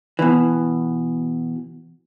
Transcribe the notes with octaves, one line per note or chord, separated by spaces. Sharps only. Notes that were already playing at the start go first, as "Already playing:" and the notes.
B2 E3